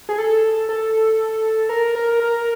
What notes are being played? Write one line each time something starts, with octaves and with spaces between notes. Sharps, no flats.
G#4
A4
A4
A#4
A#4
A#4